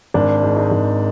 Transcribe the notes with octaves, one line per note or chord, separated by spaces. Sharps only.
G#1 D4
G#2
D#4
G#1